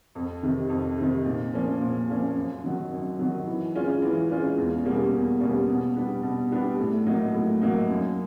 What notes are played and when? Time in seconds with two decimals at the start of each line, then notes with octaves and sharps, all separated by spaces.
0.15 F2
0.43 C3 D#3
0.69 F2
0.98 C3 D#3
1.25 A#2
1.53 F3 A#3 C#4
1.81 A#2
2.09 F3 A#3 C#4
2.36 F#2
2.64 D#3 F#3
2.91 F#2
3.19 D#3 F#3
3.47 E3
3.75 G#3 C#4 F4
4.02 E3
4.29 G#3 C#4 F4
4.57 E2
4.85 B2 G3 A#3 C#4
5.13 E2
5.40 B2 G3 A#3 C#4
5.68 B2
5.96 G3 B3 D4 G4
6.23 B2
6.51 G3 B3 D4 G4
6.79 A2
7.06 F#3 A#3 D#4
7.34 A2
7.61 F#3 A#3 D#4
7.89 F#2